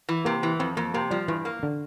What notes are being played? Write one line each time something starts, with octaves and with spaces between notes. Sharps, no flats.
E3
C3 A#3
E3
F2 C4
F2 A#3
C3 A#3
F3 G3
G2 E3
A#3
D3